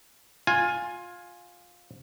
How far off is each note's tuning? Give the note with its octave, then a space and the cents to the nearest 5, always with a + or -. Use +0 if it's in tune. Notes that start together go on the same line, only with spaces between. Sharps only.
F4 +15 G#5 +0